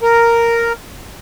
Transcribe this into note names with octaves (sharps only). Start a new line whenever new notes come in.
A#4